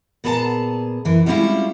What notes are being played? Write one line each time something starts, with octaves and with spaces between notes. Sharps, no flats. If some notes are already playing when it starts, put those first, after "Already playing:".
A#2 B3 G#4 A#4 A5 A#5
F#2 E3
G3 G#3 C4 C#4 E4 F4